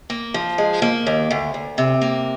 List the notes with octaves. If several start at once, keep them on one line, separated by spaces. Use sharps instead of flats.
A#3
F3
G#3
A#3
D#2
D2
D2
C3
A#3